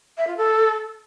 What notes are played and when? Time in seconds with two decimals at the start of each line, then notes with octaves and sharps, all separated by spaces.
0.17 E5
0.27 F4
0.37 A4